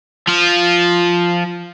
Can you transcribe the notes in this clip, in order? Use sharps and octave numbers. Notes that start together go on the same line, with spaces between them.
F3 F4